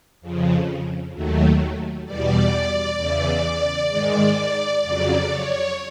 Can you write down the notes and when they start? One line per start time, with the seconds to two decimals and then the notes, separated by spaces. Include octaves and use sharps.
0.21 F2 C#3 F3
1.13 D#2 D#3 F#3 A3
2.05 E2 B2 G3 D5
2.97 E2 C#3 E3
3.89 G#2 D#3 G#3
4.81 F2 C#3 F#3 D5
5.27 C#5